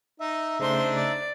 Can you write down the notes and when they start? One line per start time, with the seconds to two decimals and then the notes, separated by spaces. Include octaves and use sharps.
0.20 D#4 E5
0.60 C#3 A3 D4 D#4 C5 C6
0.96 D5